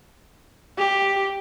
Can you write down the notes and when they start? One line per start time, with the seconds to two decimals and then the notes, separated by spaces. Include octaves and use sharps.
0.79 G4